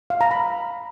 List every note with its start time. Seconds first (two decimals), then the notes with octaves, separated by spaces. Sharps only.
0.10 F5
0.21 A#5
0.31 B5